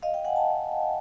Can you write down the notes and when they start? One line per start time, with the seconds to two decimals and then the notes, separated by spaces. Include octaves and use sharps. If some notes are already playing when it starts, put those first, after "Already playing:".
0.03 D#5 F5
0.14 F5 G5
0.25 F#5 G#5
0.36 G5 A5